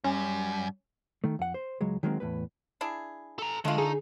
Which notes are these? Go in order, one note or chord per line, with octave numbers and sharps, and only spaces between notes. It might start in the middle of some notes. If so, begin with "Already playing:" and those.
F#2 G3 C#4
D#3 A3
F2 F#5
C5
C#2 F#3 G#3
D#3 F#3 G#3 A#3 C4
E2 A2 B4
D4 E4 G#4
A4 A#5
D3 G#3 A3 F4
D#4 G#4